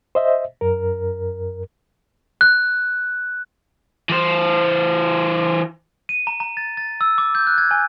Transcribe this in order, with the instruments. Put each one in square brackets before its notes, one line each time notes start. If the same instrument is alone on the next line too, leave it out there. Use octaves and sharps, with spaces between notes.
[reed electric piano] C5 D#5 E5
F#2 A#4
[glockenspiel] F#6
[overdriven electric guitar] E3 C5
[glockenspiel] D#7
A#5
A#5
A6
A6
E6
D6
G6
F#6
G#6
G#5